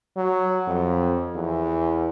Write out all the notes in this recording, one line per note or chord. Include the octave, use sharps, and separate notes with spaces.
F#3
F2
E2